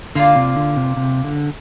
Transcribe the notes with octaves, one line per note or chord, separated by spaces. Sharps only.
D3 A#3 F4 A#4 D5
C3
D3
C3
C3
D3